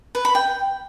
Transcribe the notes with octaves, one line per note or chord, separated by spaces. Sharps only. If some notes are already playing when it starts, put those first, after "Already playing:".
B4
B5
G5